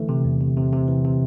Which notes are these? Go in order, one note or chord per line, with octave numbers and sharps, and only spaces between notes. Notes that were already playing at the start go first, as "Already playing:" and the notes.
Already playing: D3 E3 A3
C3
E2
C3
C3
C3
E3
C3